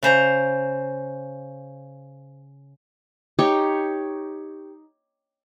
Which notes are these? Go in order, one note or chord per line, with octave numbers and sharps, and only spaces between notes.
C#3 C5 A#5
D#4 G4 C#5 C#6